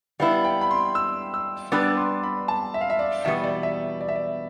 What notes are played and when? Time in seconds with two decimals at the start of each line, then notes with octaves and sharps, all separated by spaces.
0.20 G3 B3 E4 F5
0.44 G5
0.61 B5
0.71 C6
0.95 E6
1.34 E6
1.72 G3 B3 D4 G4 B4 E6
1.80 D6
1.88 E6
1.97 C6
2.23 B5
2.48 A5
2.74 E5
2.81 F5
2.90 E5
2.99 D5
3.25 E2 B2 G3 B3 E5
3.44 D5
3.63 E5
4.01 D5
4.09 E5
4.16 D5